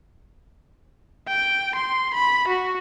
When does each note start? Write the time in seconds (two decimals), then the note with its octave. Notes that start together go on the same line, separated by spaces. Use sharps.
1.28 G5
1.75 C6
2.14 B5
2.48 F#4